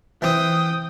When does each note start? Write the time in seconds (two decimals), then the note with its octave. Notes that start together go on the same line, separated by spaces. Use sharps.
0.22 E3 C4 G5 D#6